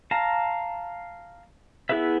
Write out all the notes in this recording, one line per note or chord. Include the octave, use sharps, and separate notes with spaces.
F5 A5 A#5
B3 E4 G#4 B4 E5